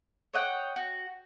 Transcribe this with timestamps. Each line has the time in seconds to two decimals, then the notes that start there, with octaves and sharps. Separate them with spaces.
0.33 C#5 D#5 F#5 G5
0.76 F#4